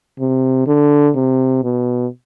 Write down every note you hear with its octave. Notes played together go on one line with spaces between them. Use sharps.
C3
D3
C3
B2